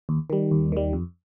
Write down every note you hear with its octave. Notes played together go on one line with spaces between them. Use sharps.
D#2
D#3 G3
D#2
D#3 G3
F2